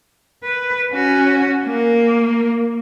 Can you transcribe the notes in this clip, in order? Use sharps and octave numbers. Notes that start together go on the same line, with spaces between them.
B4
C#4 F#4
A#3